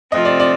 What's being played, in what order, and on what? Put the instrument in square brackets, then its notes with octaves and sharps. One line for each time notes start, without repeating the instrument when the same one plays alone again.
[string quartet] C3 F3 A3 C4 [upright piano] D#5
[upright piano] D5
D5